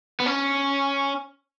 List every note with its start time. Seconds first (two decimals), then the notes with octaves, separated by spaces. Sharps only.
0.20 B3
0.26 C#4